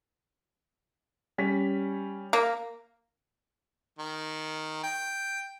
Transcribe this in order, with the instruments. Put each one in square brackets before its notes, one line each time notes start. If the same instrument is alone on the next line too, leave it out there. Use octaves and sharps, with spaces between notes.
[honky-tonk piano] G3 C#4 B6
[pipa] A#3
[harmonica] D#3
G5